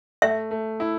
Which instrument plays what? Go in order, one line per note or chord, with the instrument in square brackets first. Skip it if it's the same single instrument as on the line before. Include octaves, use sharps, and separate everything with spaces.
[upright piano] A3 [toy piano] E5
[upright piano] A3
E4